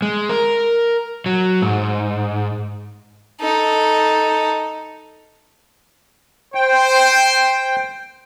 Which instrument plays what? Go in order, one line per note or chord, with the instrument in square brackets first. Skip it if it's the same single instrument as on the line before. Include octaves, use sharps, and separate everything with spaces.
[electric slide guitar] G#3
A#4
F#3
G#2
[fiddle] D#4 A4
[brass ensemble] C5 [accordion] G5